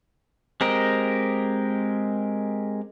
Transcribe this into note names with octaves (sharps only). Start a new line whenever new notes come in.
G#3 C4 G4 A#4 D#5